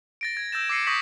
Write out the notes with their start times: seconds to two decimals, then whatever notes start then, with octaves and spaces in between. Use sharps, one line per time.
0.21 A6 A#6 D7
0.37 G#6
0.52 E6 G6 A6 E7
0.69 D6 E6 A#6 C7 C#7 D#7
0.87 C#6 D#6 G6 A#6 B6 F#7